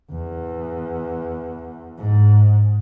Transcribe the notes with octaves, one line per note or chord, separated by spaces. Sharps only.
E2
G#2